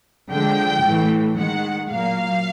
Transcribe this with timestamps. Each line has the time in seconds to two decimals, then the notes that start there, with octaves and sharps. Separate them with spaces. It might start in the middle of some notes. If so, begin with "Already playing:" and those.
0.32 D3 F3 G#3 G5
0.85 A2 E3 A3
1.38 D#3 G#3 F#5
1.90 A#2 F#3 A#3 F5